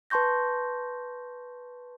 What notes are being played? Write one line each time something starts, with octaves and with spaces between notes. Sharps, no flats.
B4 A5 C6 C#6 G6 A#6